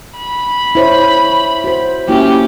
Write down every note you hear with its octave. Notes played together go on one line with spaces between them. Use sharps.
B5
E4 C5 C#5
F#4 C5
A#3 C#4 E4 F#4 G4